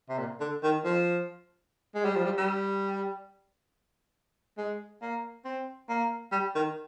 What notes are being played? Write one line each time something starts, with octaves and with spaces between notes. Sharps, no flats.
C3
A#2
D3
D#3
F3
G#3
G3
F3
G3
G3
G#3
A#3
C4
A#3
G3
D#3